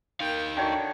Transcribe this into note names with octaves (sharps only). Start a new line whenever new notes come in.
D#4 A#4 F5 G5
D3 D#3 F#4 C#5 G5